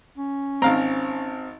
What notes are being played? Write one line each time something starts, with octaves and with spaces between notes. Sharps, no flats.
C#4
G#1 C4 F5 A#5